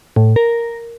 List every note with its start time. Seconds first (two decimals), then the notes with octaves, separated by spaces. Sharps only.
0.16 A2
0.36 A#4